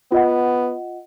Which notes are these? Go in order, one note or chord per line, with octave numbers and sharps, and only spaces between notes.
B3 F4 D#5 F#5